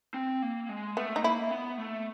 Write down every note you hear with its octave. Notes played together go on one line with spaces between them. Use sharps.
C4
A#3
G#3
A3 B3
D#4
A#3 E4
B3
A3